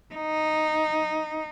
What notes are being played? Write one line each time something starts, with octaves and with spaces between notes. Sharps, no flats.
D#4